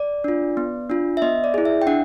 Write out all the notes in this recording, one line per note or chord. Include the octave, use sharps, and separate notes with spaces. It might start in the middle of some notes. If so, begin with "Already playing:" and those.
Already playing: D5
D4 F4
B3
D4 F4
E5
B3 D#5
D5
E4 G#4
E5
G5
D4 F#5